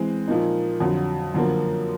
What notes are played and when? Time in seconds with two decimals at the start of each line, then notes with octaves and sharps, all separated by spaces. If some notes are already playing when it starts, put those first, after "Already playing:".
Already playing: E3 G#3 C4
0.28 A#2 F3 A#3 D#4
0.80 F2 D3 F#3
1.34 F#2 D3 F3 A#3